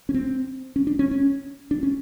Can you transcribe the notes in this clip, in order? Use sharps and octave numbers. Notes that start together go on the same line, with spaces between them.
C#4
C4
C#4
D4
C#4
C#4
D4
C#4